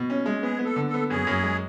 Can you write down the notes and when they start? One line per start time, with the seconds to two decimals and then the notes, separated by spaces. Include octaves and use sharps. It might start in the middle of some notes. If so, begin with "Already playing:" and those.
Already playing: B2
0.10 C#4
0.26 G#3
0.43 B3 G#4
0.59 B3
0.65 A4
0.76 D3
0.88 A4
0.94 B3
1.10 F#2 G#4
1.27 F#2
1.43 G#3